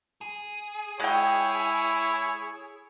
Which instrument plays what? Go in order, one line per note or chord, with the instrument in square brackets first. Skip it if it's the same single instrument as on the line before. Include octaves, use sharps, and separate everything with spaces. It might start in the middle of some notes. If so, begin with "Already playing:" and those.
[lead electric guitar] G#4
[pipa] G#3 G5 [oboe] E4 [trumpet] C#5